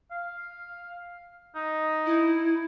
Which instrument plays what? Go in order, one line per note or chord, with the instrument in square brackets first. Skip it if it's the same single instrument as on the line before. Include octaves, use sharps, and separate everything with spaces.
[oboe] F5
D#4
[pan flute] E4